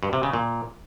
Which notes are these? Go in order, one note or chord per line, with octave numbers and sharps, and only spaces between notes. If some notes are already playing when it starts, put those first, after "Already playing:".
G2
C3
C#3
A#2